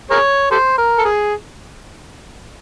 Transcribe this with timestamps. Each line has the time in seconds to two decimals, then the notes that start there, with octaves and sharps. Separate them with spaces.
0.11 G#4 A#4 C#5
0.51 G4 A4 C5
0.78 A#4
0.98 A4
1.05 G#4